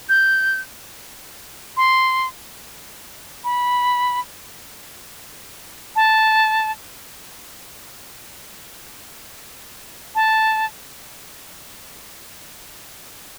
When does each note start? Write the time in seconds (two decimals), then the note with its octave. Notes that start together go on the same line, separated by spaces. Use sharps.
0.09 G6
1.77 C6
3.44 B5
5.96 A5
10.15 A5